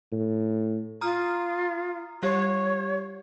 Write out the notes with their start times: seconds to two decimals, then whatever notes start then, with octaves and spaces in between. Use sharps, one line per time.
0.12 A2
1.01 F4 A#5 D#6 F6
2.23 G3 G4 C#5 G#6